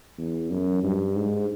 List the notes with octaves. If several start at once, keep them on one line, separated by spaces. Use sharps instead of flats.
E2
F#2
G2
G#2